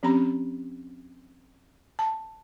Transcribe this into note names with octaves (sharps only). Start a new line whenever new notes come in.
F3 C4 C#4 G4 A#5 B5
A5